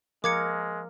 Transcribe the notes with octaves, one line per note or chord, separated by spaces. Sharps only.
F3 G#3 A#4 F5 D6 G#6 C#7